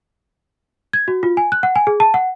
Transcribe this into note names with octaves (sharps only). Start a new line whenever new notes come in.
G#6
F#4
F4
G#5
F#6
F#5
G#5
G#4
A5
F#5